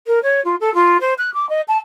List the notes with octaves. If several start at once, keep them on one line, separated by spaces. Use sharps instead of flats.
A#4
C#5
F4
A4
F4
C5
F#6
D6
D#5
A5